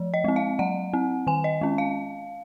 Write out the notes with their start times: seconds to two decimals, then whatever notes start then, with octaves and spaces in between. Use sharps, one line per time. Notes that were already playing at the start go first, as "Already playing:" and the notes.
Already playing: F3
0.14 D#5
0.24 G#3 C4
0.36 F5
0.59 F#3 F#5
0.93 C4
1.27 D#3 G#5
1.44 D#5
1.61 G#3 C#4
1.78 F5